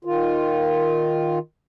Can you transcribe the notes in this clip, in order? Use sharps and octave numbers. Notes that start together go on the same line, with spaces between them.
D#3 F4